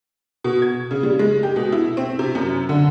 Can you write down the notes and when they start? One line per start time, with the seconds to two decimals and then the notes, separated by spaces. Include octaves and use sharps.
0.44 B2
0.62 G#6
0.91 C#3
1.03 G3
1.19 G#3
1.43 G4
1.56 B2
1.72 E4
1.97 C4
2.19 C3
2.35 F#2
2.69 D3